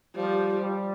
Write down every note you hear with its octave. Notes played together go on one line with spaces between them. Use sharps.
F3 G3
G3